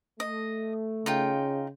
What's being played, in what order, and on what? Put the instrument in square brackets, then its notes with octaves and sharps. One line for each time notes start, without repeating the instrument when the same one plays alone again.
[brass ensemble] A3 [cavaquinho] D#5
[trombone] C#3 [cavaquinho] D#4 F4 G5